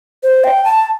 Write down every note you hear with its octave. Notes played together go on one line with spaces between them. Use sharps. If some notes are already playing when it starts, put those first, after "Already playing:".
C5
G5
A5